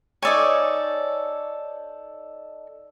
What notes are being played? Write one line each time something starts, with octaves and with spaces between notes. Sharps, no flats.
D#4 A4 C#5 D5 G#5